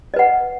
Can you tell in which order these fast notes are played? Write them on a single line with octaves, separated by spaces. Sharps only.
D#5 B4 F#5